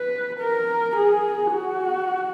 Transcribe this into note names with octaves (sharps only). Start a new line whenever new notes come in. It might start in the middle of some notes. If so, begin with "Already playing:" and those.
Already playing: B4
A#4
G#4
F#4